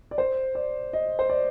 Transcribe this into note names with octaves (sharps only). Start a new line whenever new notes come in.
D5
C5
D5
D#5
C5
D5